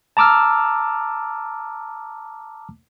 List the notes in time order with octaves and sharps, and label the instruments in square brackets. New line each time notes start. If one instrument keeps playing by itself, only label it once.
[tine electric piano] A5 A#5 D6 E6 F6